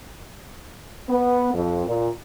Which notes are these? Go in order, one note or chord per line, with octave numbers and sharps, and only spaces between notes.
B3
F2
A#2